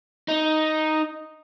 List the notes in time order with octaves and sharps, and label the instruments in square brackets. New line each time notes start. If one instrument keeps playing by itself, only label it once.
[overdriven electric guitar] D#4